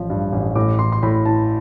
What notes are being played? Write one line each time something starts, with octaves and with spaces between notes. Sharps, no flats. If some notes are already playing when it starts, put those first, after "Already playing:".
Already playing: A1 F3
G2
A1
A2 D6
E3 C6
C6
A2 B5
E3 A5